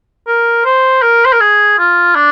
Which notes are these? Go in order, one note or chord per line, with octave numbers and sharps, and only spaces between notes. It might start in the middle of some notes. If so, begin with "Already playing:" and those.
A#4
C5
A#4
C5
A#4
G#4
F4
D4